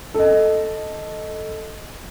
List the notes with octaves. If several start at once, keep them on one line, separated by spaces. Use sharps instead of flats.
A4 D#5